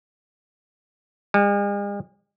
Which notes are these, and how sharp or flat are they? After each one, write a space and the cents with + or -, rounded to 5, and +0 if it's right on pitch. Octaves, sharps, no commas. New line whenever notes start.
G#3 -45